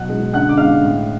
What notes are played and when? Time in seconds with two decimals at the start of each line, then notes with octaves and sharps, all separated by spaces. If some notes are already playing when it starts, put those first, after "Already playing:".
Already playing: B2 F#3 F#5 F#6
0.09 G#3
0.33 D3 F#5 F#6
0.49 D6
0.57 G#3 F5 F6
0.82 A2